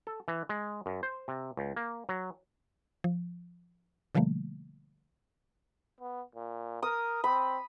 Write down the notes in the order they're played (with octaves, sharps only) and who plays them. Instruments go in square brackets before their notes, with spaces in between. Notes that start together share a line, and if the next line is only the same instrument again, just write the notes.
[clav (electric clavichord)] A4
E3
G#3
F#2
C5
C3
C#2
A#3
F#3
[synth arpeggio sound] F3
B2 D3 F3 G3 A3 A#3
[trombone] B3
A#2
[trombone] A#4 [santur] D#6
[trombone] C4 [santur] B5